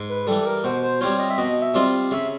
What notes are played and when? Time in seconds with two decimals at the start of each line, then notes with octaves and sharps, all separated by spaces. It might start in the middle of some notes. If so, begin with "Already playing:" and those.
Already playing: G#2
0.09 B4
0.27 E3 G3 A4
0.46 A#4
0.64 B2 C5
0.83 C5
1.01 G3 C4 F4 C#5
1.19 D#5
1.30 E5
1.38 B2 D#5
1.62 E5
1.74 G3 C4 F4
2.11 C#3 E5